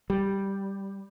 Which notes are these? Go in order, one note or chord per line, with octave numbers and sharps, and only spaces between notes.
G3